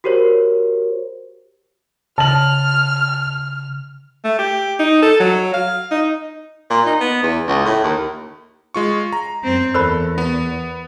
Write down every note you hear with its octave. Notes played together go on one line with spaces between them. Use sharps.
F#4 G4 A#4 C5 C#5
C#3 A5 F6 F#7
A3
G4
D#4
A4
F#3
F5
D#4
A#2
D#4
B3
E2
C#2
A2
D#2
G#3 F4 C#6
A#5
F#2 C4
E2 A4 A#4 C5 B5
B3